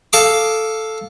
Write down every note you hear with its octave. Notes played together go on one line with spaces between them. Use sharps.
A4 F5 D6 D#6